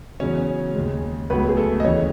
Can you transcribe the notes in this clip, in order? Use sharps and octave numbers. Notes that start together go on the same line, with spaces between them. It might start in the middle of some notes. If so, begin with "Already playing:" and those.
E2 C#3 F#3 C#4 C#5
D#2 C#3 G#3
C#2 C#3 F#3 A3 B3 B4
G#4
A3 A4
D#5
D#2 C#3 E3 C#4 C#5